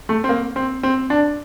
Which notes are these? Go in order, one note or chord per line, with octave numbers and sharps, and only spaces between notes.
A3
C4
A#3
C4
C4
D4